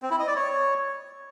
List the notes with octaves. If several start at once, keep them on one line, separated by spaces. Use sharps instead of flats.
C4
E4
D#5
D5
C#5